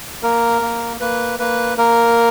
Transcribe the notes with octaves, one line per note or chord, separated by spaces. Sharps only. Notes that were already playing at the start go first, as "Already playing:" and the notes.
A#3 A#4
A#3
A#3 B4
A#3 B4
A#3 A#4